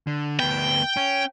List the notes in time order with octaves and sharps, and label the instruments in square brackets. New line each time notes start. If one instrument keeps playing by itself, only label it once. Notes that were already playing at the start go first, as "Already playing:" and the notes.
[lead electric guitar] D3
[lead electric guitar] D2 B3 [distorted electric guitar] G5
[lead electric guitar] C#4